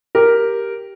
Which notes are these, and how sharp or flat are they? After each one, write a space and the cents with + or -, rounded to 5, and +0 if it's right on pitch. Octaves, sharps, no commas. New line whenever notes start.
G4 +0 A#4 +0